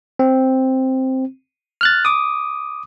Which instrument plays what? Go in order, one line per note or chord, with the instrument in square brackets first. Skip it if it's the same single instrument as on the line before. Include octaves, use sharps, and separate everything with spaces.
[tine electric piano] C4
F6 F#6 A6
D6 D#6